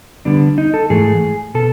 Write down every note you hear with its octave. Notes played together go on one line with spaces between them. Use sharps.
D3 G3 B3 D4
D#4
A4
G#2 E3 A3 G#4
B2 A4